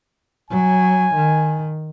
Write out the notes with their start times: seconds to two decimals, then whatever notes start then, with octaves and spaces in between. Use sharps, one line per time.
0.51 F#3 G#5
1.15 D#3